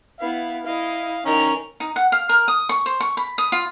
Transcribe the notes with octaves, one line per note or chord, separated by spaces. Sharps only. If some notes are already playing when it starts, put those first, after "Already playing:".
B3 E4 F5
E4 D#5 F5
D#3 C#4 A#4 A#5 F7
D#4
F#5
F5
A#4
D#6
C#6
C5
C#6
B5
D#6
F4